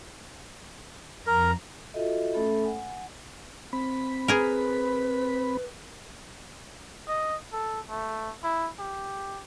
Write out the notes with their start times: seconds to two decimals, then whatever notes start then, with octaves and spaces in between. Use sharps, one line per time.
1.27 F2 A#4 A#5
1.94 F4 F#4 A4 D#5 E5
2.34 A3 C#4 A4 E5 B5
2.64 F#5 G#5
3.73 C4 B5
4.28 G#4 A#4 B4
7.08 D#5
7.53 A4
7.89 A3
8.44 E4
8.79 G4